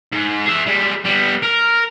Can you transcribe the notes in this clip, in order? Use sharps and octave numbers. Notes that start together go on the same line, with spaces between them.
G#2
G#4 E5
G3 G#3
G3 B3
A#4